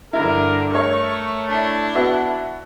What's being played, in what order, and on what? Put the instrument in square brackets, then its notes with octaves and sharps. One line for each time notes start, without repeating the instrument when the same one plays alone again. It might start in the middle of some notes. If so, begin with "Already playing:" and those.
[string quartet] G2 D3 [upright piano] E4 [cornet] A#4
[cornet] A3 [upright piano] A#4 C#5 [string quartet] C#6
[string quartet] D4 E4
[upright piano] B3 F#4 E5